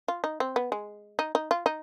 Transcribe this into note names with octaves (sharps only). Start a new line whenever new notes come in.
F4
D#4
C4
B3
G#3
D#4
D#4
F4
D#4